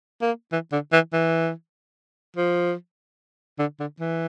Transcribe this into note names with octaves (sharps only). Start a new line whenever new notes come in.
A#3
E3
D3
E3
E3
F3
D3
D3
E3